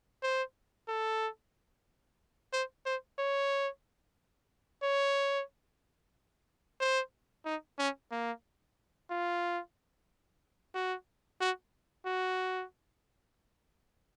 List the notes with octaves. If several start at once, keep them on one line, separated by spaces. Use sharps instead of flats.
C5
A4
C5
C5
C#5
C#5
C5
D#4
C#4
A#3
F4
F#4
F#4
F#4